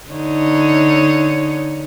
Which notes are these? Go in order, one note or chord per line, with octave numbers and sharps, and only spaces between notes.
D3 D#4 C#5